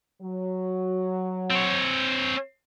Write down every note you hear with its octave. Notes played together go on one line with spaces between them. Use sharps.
F#3
C4 C#5